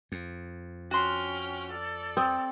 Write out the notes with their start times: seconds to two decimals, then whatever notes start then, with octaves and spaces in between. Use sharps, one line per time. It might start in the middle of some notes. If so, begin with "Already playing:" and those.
0.12 F2
0.91 C#4 F#4 G5 C6 F6
1.71 A4 D5
2.17 C4 D#6